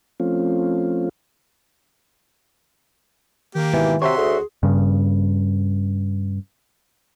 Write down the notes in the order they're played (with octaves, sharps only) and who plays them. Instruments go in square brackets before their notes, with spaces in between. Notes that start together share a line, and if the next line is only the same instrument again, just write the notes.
[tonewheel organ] F3 A3 C4 C#4 F4
[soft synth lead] D#3 [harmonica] A#3 G4
[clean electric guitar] G#2 B2 [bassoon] E3
[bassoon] C3 [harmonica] F#4 C6 [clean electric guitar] C#5 E5
[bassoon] D2 [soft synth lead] G#4
[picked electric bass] G2 C#3